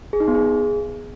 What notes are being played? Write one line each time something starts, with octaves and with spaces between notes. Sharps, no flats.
G#4
D#4
B3
G#4